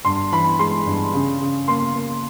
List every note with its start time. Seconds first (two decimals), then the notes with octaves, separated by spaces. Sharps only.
0.05 G2 C6
0.32 E3 B5
0.59 G#3 C6
0.86 G2
1.14 C#3
1.41 C#3
1.68 A#3 C6
1.95 A#3